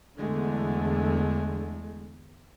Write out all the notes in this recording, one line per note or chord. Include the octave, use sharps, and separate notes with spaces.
E2 D3 G#3 A3